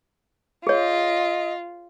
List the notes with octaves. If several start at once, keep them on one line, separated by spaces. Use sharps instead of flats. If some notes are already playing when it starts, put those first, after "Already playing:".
F4 G#4 C#5 D#5